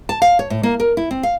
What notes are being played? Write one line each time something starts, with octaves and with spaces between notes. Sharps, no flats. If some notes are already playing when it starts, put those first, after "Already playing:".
A5
F5
C#5
A2
A#3
A#4
E4
C4
F5